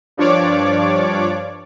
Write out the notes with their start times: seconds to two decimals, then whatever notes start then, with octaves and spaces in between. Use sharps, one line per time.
0.17 G2 F3 D4 C#5 D5 D6